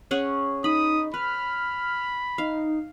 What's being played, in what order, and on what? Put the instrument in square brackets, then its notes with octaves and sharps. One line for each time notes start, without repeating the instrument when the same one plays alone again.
[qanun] C#4 G#4 F#5
[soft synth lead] D#4 [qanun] B5 [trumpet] D#6
[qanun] B4 [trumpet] B5 [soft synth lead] F6
[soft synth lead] D#4 [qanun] F5